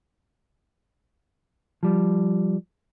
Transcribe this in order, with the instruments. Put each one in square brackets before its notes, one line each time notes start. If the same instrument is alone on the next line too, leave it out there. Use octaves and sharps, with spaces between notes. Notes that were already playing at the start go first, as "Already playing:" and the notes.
[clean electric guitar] F3 G3